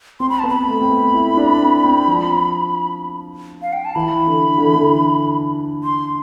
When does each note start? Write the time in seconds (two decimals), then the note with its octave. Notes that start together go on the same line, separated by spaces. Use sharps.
0.20 C4 C6
0.29 B5
0.39 A5
0.43 B3 B5
0.67 A3
0.82 C4
0.91 B3
1.14 E4
1.37 D4
1.61 C4
1.85 C4
2.08 F3
3.62 F5
3.73 G5
3.85 A5
3.95 E3 B5
4.27 D3
4.58 D3
4.66 E3
4.75 D3
5.84 C6